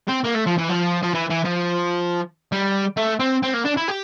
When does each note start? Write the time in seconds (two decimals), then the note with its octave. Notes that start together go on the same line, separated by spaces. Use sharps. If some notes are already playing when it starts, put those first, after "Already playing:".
0.08 C4
0.24 A#3
0.34 A3
0.46 F3
0.58 E3
0.69 F3
1.03 F3
1.15 E3
1.30 E3
1.45 F3
2.52 G3
2.97 A3
3.19 C4
3.43 C4
3.54 A#3
3.65 D4
3.77 E4
3.88 G4